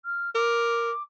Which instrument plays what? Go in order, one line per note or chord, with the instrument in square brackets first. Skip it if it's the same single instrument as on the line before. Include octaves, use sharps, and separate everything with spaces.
[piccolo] F6
[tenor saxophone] A#4 [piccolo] D6